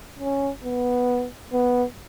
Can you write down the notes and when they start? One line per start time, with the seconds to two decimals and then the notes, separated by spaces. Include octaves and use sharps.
0.19 C#4
0.64 B3
1.53 B3